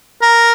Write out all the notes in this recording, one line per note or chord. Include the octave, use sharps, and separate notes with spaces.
A#4